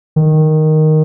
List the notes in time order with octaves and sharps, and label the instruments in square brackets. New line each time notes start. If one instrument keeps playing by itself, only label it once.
[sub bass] D#3